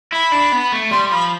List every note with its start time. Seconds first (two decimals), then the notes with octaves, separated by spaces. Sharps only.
0.13 E4 B5
0.32 D4
0.52 B3
0.72 A3
0.91 G3 C6
1.11 F3 B5